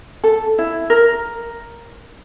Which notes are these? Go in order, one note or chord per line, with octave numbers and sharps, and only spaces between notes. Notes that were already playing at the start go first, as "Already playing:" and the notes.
A4
E4
A#4